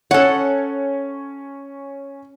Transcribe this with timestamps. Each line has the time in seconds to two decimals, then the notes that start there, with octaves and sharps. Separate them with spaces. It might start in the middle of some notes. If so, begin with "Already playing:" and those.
0.11 C#4 A4 C#5 F#5